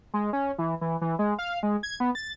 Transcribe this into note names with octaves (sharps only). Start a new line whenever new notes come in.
G#3
C#4
E3
E3
E3
G#3
F5
G#3
G#6
B3
A6